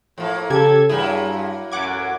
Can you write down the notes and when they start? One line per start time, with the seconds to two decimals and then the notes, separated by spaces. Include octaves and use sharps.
0.18 A2 F3 A#3
0.50 C#3 G4 A4 G#6
0.89 G2 F#3 A#3 E4 G#4
1.72 A1 F#2 F#5 D6 G#6